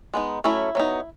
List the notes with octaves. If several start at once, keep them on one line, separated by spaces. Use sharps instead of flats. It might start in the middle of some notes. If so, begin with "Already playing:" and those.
G#3 B3 D#4
F#3 A3 C#4 E4
F#3 B3 D#4